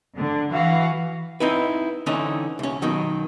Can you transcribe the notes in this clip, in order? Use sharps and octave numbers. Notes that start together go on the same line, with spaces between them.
D3
E3 F#4 F5
C4 D#4 E4 B4
D3 E3 C4 C#4 D#4
C2 C#4
B2 D#3 F#3